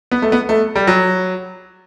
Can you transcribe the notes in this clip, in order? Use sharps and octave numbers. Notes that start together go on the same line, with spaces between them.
B3
A3
B3
A3
G3
F#3